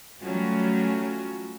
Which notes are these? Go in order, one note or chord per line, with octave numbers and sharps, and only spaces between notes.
F#3 G3 A3 C#4 F4 F#4